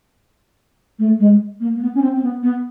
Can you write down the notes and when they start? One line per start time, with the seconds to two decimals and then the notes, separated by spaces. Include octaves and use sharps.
0.98 A3
1.19 G#3
1.60 A#3
1.75 A#3
1.81 B3
1.94 C#4
2.01 C4
2.15 C4
2.22 B3
2.42 B3